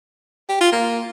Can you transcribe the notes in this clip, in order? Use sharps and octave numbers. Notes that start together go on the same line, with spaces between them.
G4
F4
A#3